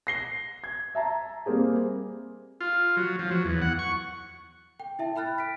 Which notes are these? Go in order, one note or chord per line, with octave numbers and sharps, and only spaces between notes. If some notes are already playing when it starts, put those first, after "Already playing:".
A#6 C7 G7
G#6
E5 A5 A#5
G3 A#3 C4 G#4
F4
F#3
F3
F#3
E2
F#5
C#6
G5
E4 E5 A5
G5 B5 F6 F#6 A6
B6 D7